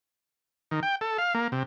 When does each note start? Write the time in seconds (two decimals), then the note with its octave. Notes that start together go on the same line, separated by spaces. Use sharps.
0.71 D#3
0.83 G5
1.01 A4
1.18 F5
1.34 A#3
1.52 C3